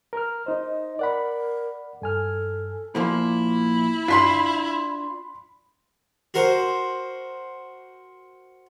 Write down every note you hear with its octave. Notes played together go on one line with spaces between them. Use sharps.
A#4 F6
D#4 C5 D#5
A#4 D5 F#5 B5
G2 A4 G#5 F6
A#2 F3 A#3 E4
D4 F4 B5 C6 B6
F#4 A#4 C5